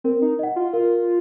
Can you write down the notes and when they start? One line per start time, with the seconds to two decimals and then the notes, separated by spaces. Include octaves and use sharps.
0.04 C4 A#4
0.22 D#4
0.39 D#5 F#5
0.56 F4
0.73 F4 A#4